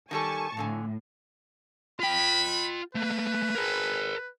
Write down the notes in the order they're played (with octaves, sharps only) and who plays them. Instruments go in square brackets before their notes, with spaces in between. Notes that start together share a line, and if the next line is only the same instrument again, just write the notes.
[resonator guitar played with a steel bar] D#3 G3 A4 [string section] G#5 A5 C#6
[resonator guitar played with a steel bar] F2 D3 G#5 [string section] A2
[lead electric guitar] F4 G5 [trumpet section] B5
[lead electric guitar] A3 A#3 [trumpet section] B4
[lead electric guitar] G#4 A#4